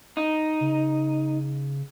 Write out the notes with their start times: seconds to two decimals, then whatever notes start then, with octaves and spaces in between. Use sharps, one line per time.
0.17 D#4
0.61 C#3